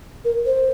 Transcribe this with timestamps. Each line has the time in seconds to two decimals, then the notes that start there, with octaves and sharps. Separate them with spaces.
0.25 A#4
0.46 C5